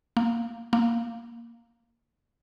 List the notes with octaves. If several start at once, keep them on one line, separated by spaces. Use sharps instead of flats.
A#3
A#3